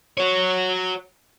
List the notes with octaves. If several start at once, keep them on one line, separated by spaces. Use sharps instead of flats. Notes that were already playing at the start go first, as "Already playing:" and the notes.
F#4 C#5